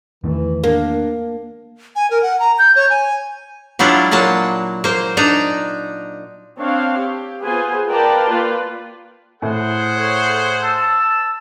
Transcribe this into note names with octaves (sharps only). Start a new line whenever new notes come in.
E2 D#3 E3 A3
A#3 D4
G#5
A#4
F#5
A#5
G6
C#5
G#5
F#3 G3 D4 E4 F4
A#2 F#3 A#3 A5
A#3 C5
D4 D#4 A#5
C4 D4 C#5 F5
G4
B3 F4 G#4 B4 C5 G#5
A#4 B4 D5 F5 G5 A5
A#3 F4 B4 D5
A2 G#4 C5 F#5
A4 C#5
A5 E6